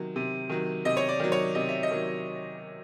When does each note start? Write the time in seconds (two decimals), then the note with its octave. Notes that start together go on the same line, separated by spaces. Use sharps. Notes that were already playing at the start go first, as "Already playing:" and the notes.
Already playing: C3 D#3 F#3
0.16 C3
0.50 D#3 F#3
0.85 C3 D#5
0.97 C#5
1.09 D5
1.20 D#3 F#3
1.32 C#5
1.55 C3 D#5
1.69 E5
1.83 D#5
1.91 D#3 F#3